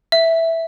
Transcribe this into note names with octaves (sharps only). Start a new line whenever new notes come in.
E5